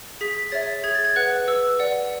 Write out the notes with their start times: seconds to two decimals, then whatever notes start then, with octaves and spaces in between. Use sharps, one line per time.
0.21 G#4 B6
0.52 C#5 E5 A6
0.84 G#4 G#6
0.95 A6
1.04 G#6
1.16 B4 F#5 F#6
1.48 B4 E6
1.79 D5 F#5